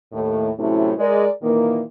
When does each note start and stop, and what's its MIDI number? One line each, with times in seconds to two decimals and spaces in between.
0.13 0.49 39
0.13 0.49 45
0.13 0.49 57
0.58 0.93 45
0.58 0.93 48
0.58 0.93 54
0.58 0.93 57
0.58 0.93 61
0.58 0.93 64
0.98 1.27 56
0.98 1.27 70
0.98 1.27 74
1.42 1.81 46
1.42 1.81 51
1.42 1.81 52
1.42 1.81 58